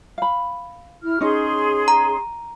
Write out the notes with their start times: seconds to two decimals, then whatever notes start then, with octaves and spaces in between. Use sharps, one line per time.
0.18 F5 B5
1.03 E4 F6
1.21 C#4 D#4 G#4 C6
1.88 A#5